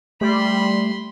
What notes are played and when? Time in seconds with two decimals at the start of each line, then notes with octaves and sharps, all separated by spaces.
0.21 G3 A3 B5 C6